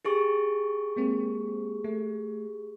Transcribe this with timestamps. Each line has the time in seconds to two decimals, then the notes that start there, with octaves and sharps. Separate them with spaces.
0.05 G4 G#4 C#6
0.96 G#3 A#3 C4
1.84 A3